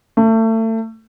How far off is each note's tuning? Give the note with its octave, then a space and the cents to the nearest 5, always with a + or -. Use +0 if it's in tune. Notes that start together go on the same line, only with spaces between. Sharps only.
A3 +30